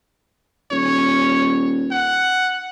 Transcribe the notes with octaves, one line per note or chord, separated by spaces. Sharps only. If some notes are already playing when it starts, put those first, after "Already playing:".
D#1 C#5
F#5